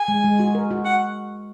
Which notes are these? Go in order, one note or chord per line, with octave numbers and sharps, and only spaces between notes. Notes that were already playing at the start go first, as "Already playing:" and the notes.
Already playing: G#5
G#3
G#3
F#4
A#4
F#4
F#5